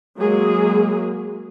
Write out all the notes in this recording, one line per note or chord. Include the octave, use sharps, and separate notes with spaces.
F#3 G#3 A#3 G#4